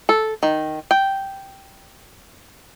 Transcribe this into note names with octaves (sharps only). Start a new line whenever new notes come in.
A4
D#3
G5